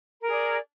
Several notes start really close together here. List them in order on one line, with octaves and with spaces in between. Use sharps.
A#4 G#4 D5